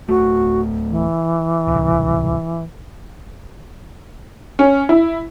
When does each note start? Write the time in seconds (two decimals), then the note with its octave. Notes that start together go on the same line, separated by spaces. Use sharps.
0.09 D1 A3 F#4
0.90 E3
1.67 D1 C2
4.59 C#4
4.89 E4